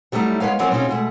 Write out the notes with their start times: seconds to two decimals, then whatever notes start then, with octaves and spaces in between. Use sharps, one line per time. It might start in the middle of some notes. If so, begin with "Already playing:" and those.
0.12 F#3 G3 A3 C4 D#4 E4
0.40 G#3 B3 B4 C#5 F5
0.59 E3 F#3 C4 A#4 C#5 D5
0.71 B2 C4 C#4 D#4 F4 G#4
0.89 B2 G#3 A3